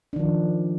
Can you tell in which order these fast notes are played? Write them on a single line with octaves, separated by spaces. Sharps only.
D4 D#3 F3